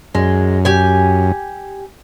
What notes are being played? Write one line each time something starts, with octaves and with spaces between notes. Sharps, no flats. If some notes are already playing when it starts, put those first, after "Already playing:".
F#2 G#3
G4 G#5